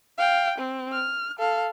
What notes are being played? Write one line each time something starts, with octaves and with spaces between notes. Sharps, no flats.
F5 G5
C4
F6
A4 F5